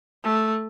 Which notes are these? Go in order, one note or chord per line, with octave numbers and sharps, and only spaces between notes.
A3